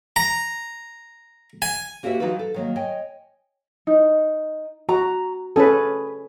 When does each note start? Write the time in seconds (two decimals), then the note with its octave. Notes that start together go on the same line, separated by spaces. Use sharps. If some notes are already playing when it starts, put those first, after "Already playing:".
0.16 A#5
1.62 G#5
2.03 A#3 F#4 G4 B4 D#5 E5
2.20 E3 F#3 D#4 F4 F#4 B4
2.39 A4
2.54 D#3 F#3 A#3
2.76 C#5 D#5 G5 G#5
3.87 D#4
4.89 F#4 A#5
5.56 C#4 G#4 A4 B4